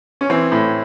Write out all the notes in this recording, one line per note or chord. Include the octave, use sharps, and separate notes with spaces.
C#4
E3 C4
A2